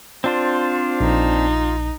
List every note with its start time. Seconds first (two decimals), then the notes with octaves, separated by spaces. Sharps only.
0.24 C4 D4 F4 C5
1.00 A#1 D#4